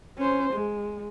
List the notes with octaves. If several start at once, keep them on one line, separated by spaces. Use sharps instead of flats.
C#4 C5
G#3